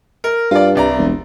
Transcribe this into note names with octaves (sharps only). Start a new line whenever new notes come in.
A#4
G2 F4 D5
C2 D5 A#5
E1